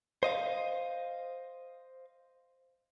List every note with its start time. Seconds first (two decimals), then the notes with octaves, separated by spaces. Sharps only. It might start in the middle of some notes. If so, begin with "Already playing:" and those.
0.23 C5 D#5 F5